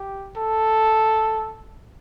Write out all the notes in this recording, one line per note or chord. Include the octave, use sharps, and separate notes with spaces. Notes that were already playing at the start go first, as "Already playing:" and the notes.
Already playing: G4
A4